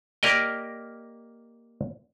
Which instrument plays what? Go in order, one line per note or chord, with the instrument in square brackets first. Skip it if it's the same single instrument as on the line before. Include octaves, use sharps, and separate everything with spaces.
[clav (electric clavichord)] A#3 G4 A#4 D5 D#5 G5